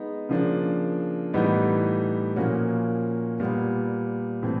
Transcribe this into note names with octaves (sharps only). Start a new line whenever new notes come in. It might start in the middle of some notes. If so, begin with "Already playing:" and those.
Already playing: G#3 B3 D#4
C#3 F3 A#3 D4
A2 E3 G3 B3 D#4
A#2 F3 A#3 C#4 F#4
A#2 G3 B3
A2 E3 A3 C4